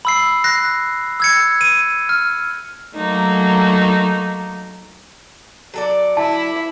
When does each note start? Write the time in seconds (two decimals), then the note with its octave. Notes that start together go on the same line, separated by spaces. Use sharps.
0.05 B5 E6 C7
0.44 F#6 A#6 C7
1.20 E6 G#6 C#7
1.61 D#7
2.09 F6
2.96 F#3 A3 A#3 D#4
5.74 F#3 A4 D5
6.17 E4 A5